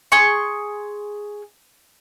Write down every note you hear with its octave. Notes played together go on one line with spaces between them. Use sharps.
G#4 C6 C#6